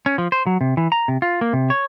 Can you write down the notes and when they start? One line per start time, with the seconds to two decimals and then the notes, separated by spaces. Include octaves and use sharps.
0.06 C#4
0.18 F3
0.32 C5
0.47 F#3
0.61 C3
0.77 E3
0.92 A#5
1.08 C3
1.22 F4
1.41 A#3
1.53 C3
1.70 C#5